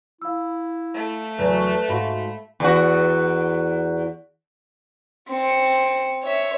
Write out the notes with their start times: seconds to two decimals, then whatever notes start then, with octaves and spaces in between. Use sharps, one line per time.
0.22 E4 F5 E6
0.94 A3
1.38 E2 C#3 F#3 B4
1.88 G#2 F#4 E5 F5 B5
2.60 E2 F#4
5.30 C4 C#7
6.24 C#5 E5